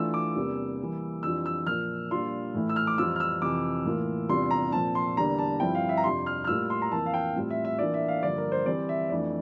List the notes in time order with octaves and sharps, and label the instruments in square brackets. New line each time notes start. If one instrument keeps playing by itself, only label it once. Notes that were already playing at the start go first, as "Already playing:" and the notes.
Already playing: [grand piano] E3 A3 D4 F4 E6
D6
E2 C3 G3 A#3 D4
E3 G3 A#3
F2 E3 G3 D4 F4 E6
E6
A#2 F3 A#3 F6
A#2 G3 D4 F4 C6
A2 E3 A3 E4
E6
F6
D6
F2 E3 G3 C4 F4 E6
F6
E6
F2 C3 E3 D6
A2 E3 A#3 F4
E2 C3 G3 D4 F4 C6
A#5
A#2 F3 C4 A5
C6
E2 D3 G3 A#3 D4 A#5
A5
G2 F3 C4 E4 G5
F5
E5
A#5
F2 C3 G3 D4 C6
F6
F6
A2 G3 A#3 F4 E6
C6
A#5
F2 E3 A#3 E4 A5
F5
G5
A2 G3 C4 F4
E5
E5
E3 A#3 D4 F4 D5
E5
F5
G2 D3 F3 A#3 D5
A#4
C5
E3 G3 C4 D5
E5
F2 E3 A3 D4 D5